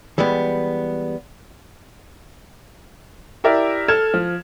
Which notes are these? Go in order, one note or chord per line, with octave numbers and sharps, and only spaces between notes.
E3 G3 G#3 B3
E4 G4 A#4 D5 E5
A4 F6 G#6 E7
F3